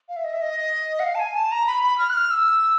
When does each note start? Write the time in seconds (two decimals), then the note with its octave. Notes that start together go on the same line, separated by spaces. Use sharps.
0.09 F5
0.16 E5
0.24 D#5
0.33 E5
0.41 D#5
1.00 F#5
1.04 F5
1.15 A5
1.19 G#5
1.35 A5
1.52 A#5
1.67 B5
1.83 B5
1.98 F6
2.10 F#6
2.14 F6
2.31 E6